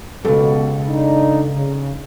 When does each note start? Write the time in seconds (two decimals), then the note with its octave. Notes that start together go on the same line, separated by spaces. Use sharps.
0.25 C#2 F#2 B2 A4
0.87 D4 D#4
1.55 C#3